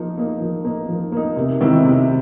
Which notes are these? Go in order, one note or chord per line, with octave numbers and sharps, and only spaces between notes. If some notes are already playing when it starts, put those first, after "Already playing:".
Already playing: F3 A#3 D#4
A#3 D#4
F3
A#3 D#4
F3
A#3 D#4
C3
D#3 G#3 C4 E4
C3